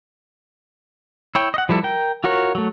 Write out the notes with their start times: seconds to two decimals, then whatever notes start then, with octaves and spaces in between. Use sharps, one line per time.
1.35 E4 C#5 G5
1.54 D#5 F#5
1.69 F3 G3 E4 A4
1.83 A#4 G5
2.24 F4 F#4 A#4 C#5
2.55 F#3 A3